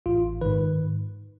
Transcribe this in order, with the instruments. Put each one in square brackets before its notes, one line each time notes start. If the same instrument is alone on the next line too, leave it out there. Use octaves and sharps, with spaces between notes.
[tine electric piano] A1 F4
G#2 D#3 B4